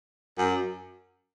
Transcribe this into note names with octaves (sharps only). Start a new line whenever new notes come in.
F#2